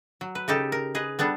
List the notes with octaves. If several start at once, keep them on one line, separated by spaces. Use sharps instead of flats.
F#3
B4
C#3 D#4 G4 A4
A#4
G#4 B4 D#5
G3 B3 D4 A4